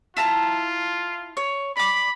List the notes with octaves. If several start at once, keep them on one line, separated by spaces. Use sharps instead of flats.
E4 F4 A5 A#5
C#5
D5 B5 D6